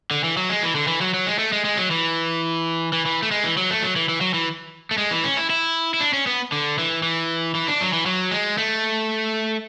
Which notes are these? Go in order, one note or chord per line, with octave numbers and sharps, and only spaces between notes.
D3
E3
F#3
G#3
E3
D3
E3
F#3
F#3
G#3
A3
G#3
G#3
F#3
E3
E3
E3
A3
G#3
E3
F#3
A3
F#3
E3
E3
F#3
E3
A3
G#3
E3
C#4
E4
E4
E4
D4
C#4
B3
D3
E3
E3
E3
D4
F#3
E3
F#3
G#3
A3